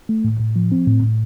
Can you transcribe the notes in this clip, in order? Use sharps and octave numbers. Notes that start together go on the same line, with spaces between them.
A3
A2
A2
F3
C4
A2
A2